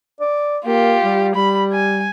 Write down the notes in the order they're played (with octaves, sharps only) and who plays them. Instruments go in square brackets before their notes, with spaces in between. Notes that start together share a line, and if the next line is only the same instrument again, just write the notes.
[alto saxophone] D5
[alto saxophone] A#3 [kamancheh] F4 G4
[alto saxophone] G3
[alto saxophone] G3 [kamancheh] B5
[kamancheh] G#5